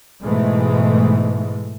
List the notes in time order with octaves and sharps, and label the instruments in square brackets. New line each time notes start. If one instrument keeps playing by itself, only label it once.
[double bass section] G#2 B2 E3 G#3 A3